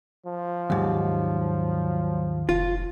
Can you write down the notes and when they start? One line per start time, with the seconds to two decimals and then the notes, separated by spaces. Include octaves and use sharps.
0.26 F3
0.70 D#2 G#2 F#3
2.49 F1 F4